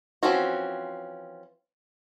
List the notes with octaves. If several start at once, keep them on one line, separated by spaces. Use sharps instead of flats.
E3 F3 C4 C#4 F#4